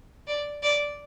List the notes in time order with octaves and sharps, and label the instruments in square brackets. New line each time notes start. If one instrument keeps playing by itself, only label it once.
[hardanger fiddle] D5
D5